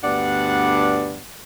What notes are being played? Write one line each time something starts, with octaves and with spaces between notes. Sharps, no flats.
D2 G2 B3 D4 D5 F#5